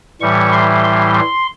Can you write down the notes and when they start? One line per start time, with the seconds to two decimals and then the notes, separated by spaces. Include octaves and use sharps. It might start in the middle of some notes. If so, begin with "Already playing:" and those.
0.21 A2 E3 G3 C#6
0.52 C6
0.84 C6
1.14 C6